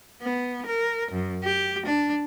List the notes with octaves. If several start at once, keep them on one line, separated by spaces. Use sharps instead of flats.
B3
A#4
F#2
G4
D4